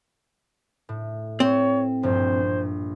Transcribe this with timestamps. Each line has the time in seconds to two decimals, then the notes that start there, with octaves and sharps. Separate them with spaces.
0.89 A2
1.40 C4 C#5
2.03 A#1 G2 C5